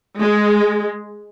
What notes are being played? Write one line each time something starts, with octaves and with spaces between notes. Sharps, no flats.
G#3